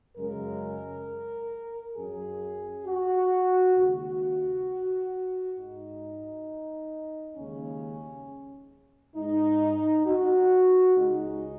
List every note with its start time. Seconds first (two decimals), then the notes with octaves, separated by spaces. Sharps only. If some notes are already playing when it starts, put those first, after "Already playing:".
0.16 F#2 C#3 G#3 A#4
1.96 F#2 F#3 G#4
2.86 F#4
3.76 D#2 C#3 G#3 F#4
5.56 G#2 G#3 D#4
7.36 D#2 C#3 G#3 C#4
9.16 G#2 G#3 D#4
10.06 F#4
10.95 C#2 C#3 G#3 D#4